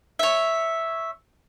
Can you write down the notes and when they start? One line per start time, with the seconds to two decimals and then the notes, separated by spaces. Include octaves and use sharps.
0.19 C#5 E5